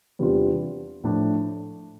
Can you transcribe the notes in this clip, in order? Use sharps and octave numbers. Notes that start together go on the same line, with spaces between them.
E2 C3 G3 D4 F4
A2 F3 A3 D4